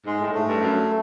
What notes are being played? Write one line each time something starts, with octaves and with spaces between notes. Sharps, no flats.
G#2 G#3
A2
G#2 A3
G2
F#2